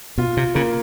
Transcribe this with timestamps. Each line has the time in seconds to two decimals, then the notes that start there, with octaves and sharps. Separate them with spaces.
0.18 B2 F4
0.37 C3
0.55 C#3 A#3